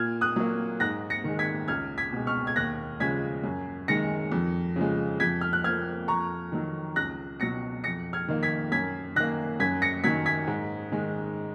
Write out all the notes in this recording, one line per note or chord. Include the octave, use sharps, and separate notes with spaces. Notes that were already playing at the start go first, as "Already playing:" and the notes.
Already playing: A#2 F6 G#6
D#6 F#6
F#3 A#3
G#2 F#6 A#6
A#6 C#7
D#3 G#3
G#6 B6
C#2 F6 G#6
G#6 B6
B2 G#3
C#6 F6
G#6
D#2 F#6 A#6
C#3 F3 G#3 G#6 B6
F#2
D#3 G#3 A#6 C#7
F2
C#3 F3 G#3
F2 G#6 B6
F6
F#6
F3 A#3 F6 G#6
F2 A#5 C#6
D#3 F#3
C#2 F#6 A#6
B2 F#3 A#6 C#7
F2 A#6 C#7
F6 G#6
D#3 A#3
G#6 B6
F#2 G#6 B6
D#3 A#3 F#6 A#6
F#2 G#6 B6
A#6 C#7
D#3 F#3 G#6 B6
G#6 B6
G#2
D#3 G#3